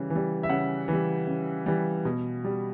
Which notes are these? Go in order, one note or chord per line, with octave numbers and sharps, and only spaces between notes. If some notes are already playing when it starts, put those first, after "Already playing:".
Already playing: C#3 E3 G3
E3
G3
E5
C#3 F#5
E3 G3
C#3
E3 G3
B2
G3